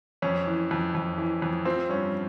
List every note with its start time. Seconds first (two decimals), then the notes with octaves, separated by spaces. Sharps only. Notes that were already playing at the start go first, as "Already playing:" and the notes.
0.22 F2 C#4
0.47 E3
0.71 F2
0.95 F2
1.18 E3
1.42 F2
1.65 F3 C4
1.89 G2 C#4